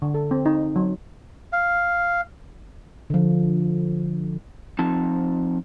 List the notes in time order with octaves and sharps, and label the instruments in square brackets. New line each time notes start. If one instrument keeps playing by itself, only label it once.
[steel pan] D3
A4
C4
D#4
F#3
[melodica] F5
[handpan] D3 F3
[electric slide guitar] F3 C4 D#4 A5